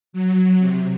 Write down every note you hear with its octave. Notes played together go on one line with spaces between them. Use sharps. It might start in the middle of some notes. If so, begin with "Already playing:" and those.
F#3
C3